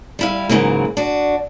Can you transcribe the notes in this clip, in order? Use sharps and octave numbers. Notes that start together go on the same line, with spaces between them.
G3 E4 F5
G#2 C#3 E3 F#3 A#3
D4 F#4